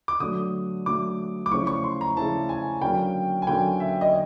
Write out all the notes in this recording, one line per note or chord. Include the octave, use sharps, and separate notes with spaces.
D6
D3 F#3 A3 D#6
D3 F#3 A3 D6
D6
C#3 F3 A3 C#4 E4 C#6
C#6
C6
A#5
C#3 F3 A3 C#4 E4 A5
G#5
D3 F#3 A#3 C#4 G5
G#5
D3 F#3 A#3 C#4 G5
E5
D#5